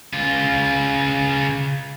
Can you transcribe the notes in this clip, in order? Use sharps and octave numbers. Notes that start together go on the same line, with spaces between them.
C#3 F4